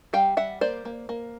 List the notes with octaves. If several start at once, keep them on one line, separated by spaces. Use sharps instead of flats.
G3 F5 G5
G3 E5 F#5
A#3 C5 D5
A#3
A#3